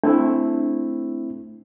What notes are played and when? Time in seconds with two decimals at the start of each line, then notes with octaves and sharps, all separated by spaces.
0.04 A3 C4 D4 E4